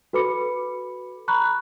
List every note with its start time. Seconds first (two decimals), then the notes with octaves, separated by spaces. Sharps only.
0.13 F#4 A4 B4 B5 D6 C#7
1.28 A#5 B5 C#6 F#6